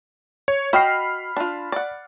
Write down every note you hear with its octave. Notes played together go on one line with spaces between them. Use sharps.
C#5
F#4 D#5 G5 B5 F6 C7
D4 F4
D5 F#5